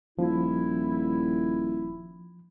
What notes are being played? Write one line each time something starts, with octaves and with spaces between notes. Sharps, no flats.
D#1 F3 E4